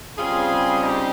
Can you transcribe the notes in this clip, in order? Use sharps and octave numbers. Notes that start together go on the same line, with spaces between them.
C#3 G3 C4 F4 G#4
D#4 G4